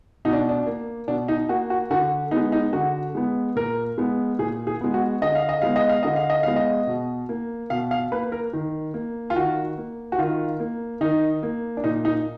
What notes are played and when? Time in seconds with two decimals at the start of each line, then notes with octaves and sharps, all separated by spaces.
0.25 B2 D#4
0.33 D4
0.49 D4
0.66 A#3
1.08 B2 D4
1.28 D#4
1.49 A#3 F#4
1.70 F#4
1.91 D3 F#4
2.31 B3 D#4
2.37 G#3
2.52 D#4
2.73 D3 F#4
3.15 G#3 B3
3.56 A#2 A#4
3.98 G#3 B3
4.39 A#2 G#4
4.67 G#4
4.81 G#3 B3
4.94 F#4
5.22 D3 D#5
5.35 F5
5.49 D#5
5.62 G#3 B3 F5
5.76 D#5
5.89 F5
6.03 D3 D#5
6.16 F5
6.30 D#5
6.43 G#3 B3 F5
6.56 D#5
6.87 B2
7.29 A#3
7.70 B2 F5
7.91 F5
8.12 A#3 B4
8.32 A#4
8.53 D#3
8.94 A#3
9.30 F4
9.36 D#3 F#4
9.78 A#3
10.12 F#4
10.18 D#3 F4
10.60 A#3
11.01 D#3 D#4
11.43 A#3
11.77 D4
11.84 A#2 D#4
12.05 D#4